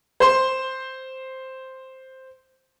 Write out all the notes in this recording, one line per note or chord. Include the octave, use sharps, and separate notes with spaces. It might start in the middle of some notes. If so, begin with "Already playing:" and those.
C5 C6